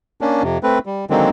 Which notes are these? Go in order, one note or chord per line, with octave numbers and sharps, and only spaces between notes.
A#3 C#4 D4
F2 C3
A3 C4 B4
G3
D3 D#3 F#3 G#3 A#3 C4